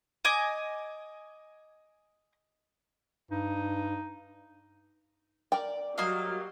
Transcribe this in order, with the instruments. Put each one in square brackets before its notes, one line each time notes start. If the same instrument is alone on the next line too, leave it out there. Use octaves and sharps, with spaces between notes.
[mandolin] D#5 G#5 D6
[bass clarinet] G2 [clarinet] D#4
[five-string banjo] A#4 G5 [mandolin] D5
[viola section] F#3 G3 [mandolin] A#3 D#5 F5